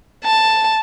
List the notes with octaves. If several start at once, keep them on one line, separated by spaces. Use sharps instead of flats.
A5